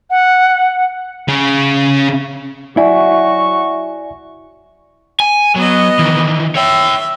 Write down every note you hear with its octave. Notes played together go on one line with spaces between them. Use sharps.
F#5
C#3 C#4
F#3 E4 F#4 D5 E5 G#5 C#6
G#5
F#3 B3 D#5
D#3 E3
C#5 E5 G5